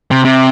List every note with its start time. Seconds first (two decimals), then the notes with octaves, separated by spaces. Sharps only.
0.11 C3
0.25 C3